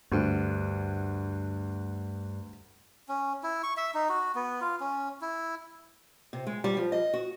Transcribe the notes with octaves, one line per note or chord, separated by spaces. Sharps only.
D2 G2
C#4
E4
C#6
E5
D#4
F#4
B3
F4
C#4
E4
C3
G#3
G3
F3
D#5
F#4